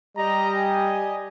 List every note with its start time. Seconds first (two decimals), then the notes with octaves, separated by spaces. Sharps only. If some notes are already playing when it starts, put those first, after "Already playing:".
0.17 G3 G4 D#5 A#5
0.56 G#5